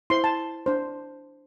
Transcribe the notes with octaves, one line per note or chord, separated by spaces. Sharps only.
E4 C5 C6
A5
D4 C5